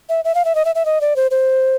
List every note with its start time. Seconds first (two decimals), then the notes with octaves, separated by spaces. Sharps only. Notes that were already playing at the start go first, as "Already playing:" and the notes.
0.09 E5
0.25 E5
0.35 F5
0.45 E5
0.55 D#5
0.65 E5
0.75 E5
0.86 D#5
1.01 D5
1.16 C5
1.31 C5